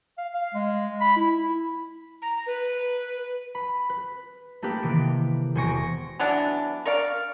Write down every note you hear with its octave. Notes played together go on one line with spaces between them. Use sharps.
F5
F5
G#3
B5
E4
E4
A#5
B4
B5
B4
A3 A#3 D#4 G4 A4 B4
C3 D#3 E3 D7
E1 C5 G#5 C#6 A#6 D7
E3 F#3 B3 D4
A#4 C#5 D5 F5